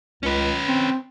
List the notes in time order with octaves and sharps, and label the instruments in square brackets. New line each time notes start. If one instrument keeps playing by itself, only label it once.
[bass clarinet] C#2 [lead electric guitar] C#4 B4
[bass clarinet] C4